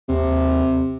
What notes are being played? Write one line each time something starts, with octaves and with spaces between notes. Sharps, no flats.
D#2 C3